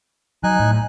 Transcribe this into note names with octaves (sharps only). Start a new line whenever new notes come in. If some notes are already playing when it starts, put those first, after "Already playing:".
F#3 D#4 G#5 F#6
A2